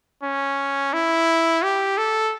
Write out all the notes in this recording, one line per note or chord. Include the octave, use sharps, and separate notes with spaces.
C#4
E4
G4
A4